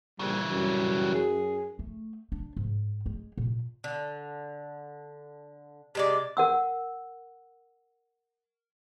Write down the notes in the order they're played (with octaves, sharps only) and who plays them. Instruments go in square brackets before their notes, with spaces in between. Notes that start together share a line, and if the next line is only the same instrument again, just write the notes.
[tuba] A#1 [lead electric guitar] C#3 E3 [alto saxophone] G3
[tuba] F#2 [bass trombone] F#3 [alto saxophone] G3
[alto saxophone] G#4
[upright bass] A3
D4
G#2
G#3
A#2
[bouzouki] D3
C3 G#3 D5
[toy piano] A#4 F#5 E6